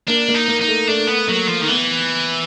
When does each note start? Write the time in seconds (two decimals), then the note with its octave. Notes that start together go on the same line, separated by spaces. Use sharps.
0.08 A#3 D4
0.28 A#3
0.35 D#4
0.48 A#3
0.61 D#4
0.68 A3
0.88 A3 D4
1.08 B3
1.28 F#3 A#3
1.48 F3
1.61 D#3
1.68 E3 B3